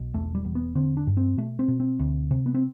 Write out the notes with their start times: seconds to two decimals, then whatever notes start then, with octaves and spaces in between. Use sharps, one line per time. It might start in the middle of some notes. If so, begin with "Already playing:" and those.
Already playing: B1 B2
0.14 E1 A3
0.35 G3
0.45 E2
0.55 B3
0.75 D3 C4
0.97 D4
1.07 G2
1.17 C4
1.37 B2 A3
1.59 C4
1.68 B2
1.80 C4
1.99 D2
2.31 C3
2.46 B3
2.54 C4